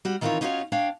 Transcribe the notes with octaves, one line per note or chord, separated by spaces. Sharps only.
G3 F#4
D#3 E3 C4 F4 A#4 C#5
C#4 D#4 F4 F#4 C5 C#5
D4 C#5 F5 G5